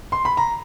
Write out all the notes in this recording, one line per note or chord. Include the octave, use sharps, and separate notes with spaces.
C6
B5
A#5